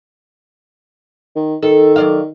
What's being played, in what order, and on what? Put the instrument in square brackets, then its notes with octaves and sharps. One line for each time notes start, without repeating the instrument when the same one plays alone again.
[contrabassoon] D#3
[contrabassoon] D#3 [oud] A4
[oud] F#3 D5 F5